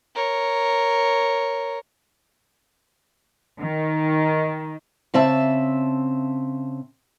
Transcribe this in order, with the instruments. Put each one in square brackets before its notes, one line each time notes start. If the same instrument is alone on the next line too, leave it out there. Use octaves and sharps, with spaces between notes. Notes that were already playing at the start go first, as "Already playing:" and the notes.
[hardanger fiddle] A#4 C#5
[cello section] D#3
[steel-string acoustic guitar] C#3 C4 E5 A5